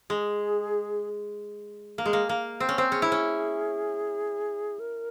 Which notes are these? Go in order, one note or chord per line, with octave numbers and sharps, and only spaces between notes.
G#3 G#4
A#3
G#3
A#3
A#3
C4
C#4
C4
C#4 G#4
E4
C#4
A#4